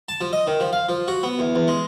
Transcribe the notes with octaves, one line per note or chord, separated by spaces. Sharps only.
A5
F3
D#5
D#3
F3
F5
F3
F#4
B3
E2
E2
G#3